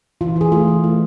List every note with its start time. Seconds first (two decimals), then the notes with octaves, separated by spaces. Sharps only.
0.21 E3 F4
0.36 E3 G#4
0.52 A3 F4
0.68 E3
0.84 A3